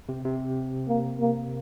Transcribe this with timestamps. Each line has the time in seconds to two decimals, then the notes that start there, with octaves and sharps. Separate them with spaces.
0.09 C3
0.24 C3
0.88 A#3
1.21 A#3